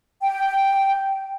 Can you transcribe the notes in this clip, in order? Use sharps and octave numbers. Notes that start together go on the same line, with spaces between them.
G5